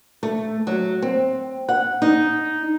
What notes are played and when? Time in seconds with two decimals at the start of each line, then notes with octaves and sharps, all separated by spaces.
0.23 A3
0.67 F#3
1.02 C4
1.69 F#5
2.02 D#4